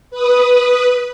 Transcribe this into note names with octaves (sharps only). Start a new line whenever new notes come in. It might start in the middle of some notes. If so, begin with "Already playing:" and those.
B4 D#6